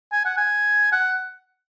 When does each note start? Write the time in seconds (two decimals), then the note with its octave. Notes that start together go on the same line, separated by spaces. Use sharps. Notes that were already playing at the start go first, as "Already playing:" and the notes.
0.12 G#5
0.25 F#5
0.37 G#5
0.92 F#5